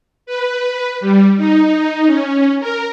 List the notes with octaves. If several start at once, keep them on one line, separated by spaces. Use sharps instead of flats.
B4
G3
D#4
C#4
A#4